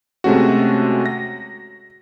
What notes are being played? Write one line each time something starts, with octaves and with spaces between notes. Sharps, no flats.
C3 G#3 A3 C#4 F#4
A#6